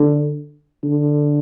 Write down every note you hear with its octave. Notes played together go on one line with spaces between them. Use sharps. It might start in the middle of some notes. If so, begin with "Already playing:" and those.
Already playing: D3
D3